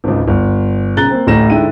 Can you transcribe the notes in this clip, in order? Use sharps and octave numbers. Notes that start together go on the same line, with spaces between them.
G#1 C#2
G1
D#1 C#3 A#5 F#6 A6 G7
A#3 C4
A1 D2 A2 A#5 A#6 E7
G#2 D3 E4 G5 D#7